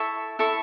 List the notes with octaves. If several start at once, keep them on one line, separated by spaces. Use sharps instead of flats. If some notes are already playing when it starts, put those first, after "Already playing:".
Already playing: E4 A4 E5 C#6
E4 A4 E5 C#6